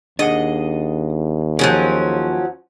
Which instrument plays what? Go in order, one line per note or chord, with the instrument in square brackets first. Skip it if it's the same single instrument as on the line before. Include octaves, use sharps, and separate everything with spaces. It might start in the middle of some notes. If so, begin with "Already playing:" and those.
[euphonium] D#2 [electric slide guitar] D4 G#4 F#5 [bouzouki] D#5
[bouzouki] F3 F#3 C#4 [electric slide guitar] G#4